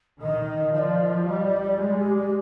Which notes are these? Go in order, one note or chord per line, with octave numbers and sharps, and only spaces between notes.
D#3 D#5
F3 D5 D#5
G3 D#5
D5
D5
G#3 D5
G4
G4